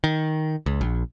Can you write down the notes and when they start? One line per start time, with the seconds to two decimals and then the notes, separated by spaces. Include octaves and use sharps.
0.04 D#3
0.66 C#2
0.81 A#1